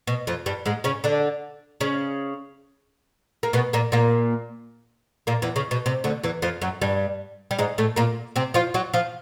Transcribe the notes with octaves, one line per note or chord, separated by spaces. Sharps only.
B2
F2 F3
G2 G3
G#2 G#3
C#3 C#4
D3 D4
C#3 C#4
A#3
B2 B3
A#2 A#3
A#2 A#3
A#2 A#3
E2 E3
C#3
B2
C3
D2 D3
E2 E3
F2 F3
F#2 F#3
G2 G3
G3
G#2 G#3
A2 A3
A#2 A#3
C3 C4
F3 F4
F#3 F#4
F3 F4